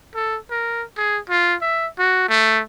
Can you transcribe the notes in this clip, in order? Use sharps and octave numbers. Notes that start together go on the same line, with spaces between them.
A4
A#4
G#4
F4
E5
F#4
A3